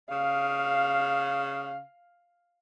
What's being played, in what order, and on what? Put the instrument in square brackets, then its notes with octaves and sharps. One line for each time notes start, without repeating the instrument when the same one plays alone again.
[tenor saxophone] C#3 [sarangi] F5